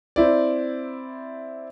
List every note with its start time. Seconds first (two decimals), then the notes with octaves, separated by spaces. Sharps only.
0.16 C4 E4 D5